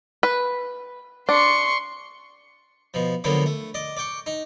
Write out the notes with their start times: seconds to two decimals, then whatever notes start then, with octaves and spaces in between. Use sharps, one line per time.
0.23 B4
1.29 D4 C6 C#6
2.94 B2 F3
3.24 D3 F3 F#3 A#3 B3
3.46 A3
3.74 D5 D#5
3.97 D5 G5 C#6
4.26 D#4